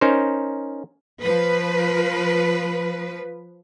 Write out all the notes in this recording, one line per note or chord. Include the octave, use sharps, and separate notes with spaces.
C#4 D#4 A#4 C5
F3 B4